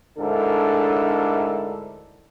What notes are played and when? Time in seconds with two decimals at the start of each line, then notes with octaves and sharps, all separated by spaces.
0.18 D2 G#2 D4 E4 A4 A#4